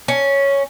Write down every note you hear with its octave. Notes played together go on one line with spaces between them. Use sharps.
C#4